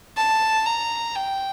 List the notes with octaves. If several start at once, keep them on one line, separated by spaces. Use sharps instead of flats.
A5
A#5
G5